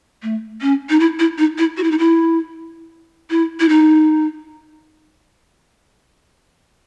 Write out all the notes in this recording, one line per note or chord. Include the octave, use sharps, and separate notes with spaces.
A3
C#4
D#4
E4
E4
D#4
E4
F#4
E4
D#4
E4
E4
E4
D#4